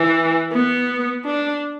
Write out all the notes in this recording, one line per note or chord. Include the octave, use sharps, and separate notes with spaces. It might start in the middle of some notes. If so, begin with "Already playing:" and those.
Already playing: E3
B3
D4